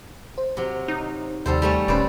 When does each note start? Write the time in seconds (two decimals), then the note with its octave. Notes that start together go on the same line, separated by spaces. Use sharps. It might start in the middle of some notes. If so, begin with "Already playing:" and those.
0.38 C5
0.57 C3 F#3
0.88 D#4
1.46 D#2 C3 G3 A4 C5
1.62 G3 A3 C#4
1.88 D#1 D#3 C#4 B4 C5 D5